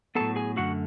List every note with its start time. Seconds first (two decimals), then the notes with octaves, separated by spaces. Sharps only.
0.15 A2 F#3 B3 A4 A5
0.36 G#4 G#5
0.56 F#2 D3 A3 F#4 F#5